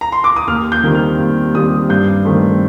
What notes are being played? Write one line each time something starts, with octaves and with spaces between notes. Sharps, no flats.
A#5
C6
D6
D#6
D#2 F6
G6
D#3 G3 C4
F6
D#2
D#3 G3 C4 D#6
G2 G6
D#3 A3 C4